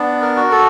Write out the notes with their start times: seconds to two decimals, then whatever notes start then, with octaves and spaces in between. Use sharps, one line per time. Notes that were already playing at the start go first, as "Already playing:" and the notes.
Already playing: B3 D4
0.21 A#4
0.37 F#4
0.51 A4